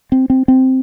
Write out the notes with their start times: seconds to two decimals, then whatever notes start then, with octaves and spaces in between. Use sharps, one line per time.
0.12 C4
0.30 C4
0.48 C4